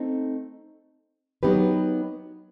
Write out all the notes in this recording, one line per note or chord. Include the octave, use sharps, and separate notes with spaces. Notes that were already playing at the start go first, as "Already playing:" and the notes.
Already playing: A3 C4 D#4
F#3 B3 D#4 G4 B4